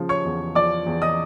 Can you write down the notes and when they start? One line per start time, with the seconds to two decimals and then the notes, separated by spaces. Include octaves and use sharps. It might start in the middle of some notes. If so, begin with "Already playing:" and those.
Already playing: C#3 F3
0.09 C#5 C#6
0.25 E2
0.55 F3 D5 D6
0.86 E2
1.02 D#5 D#6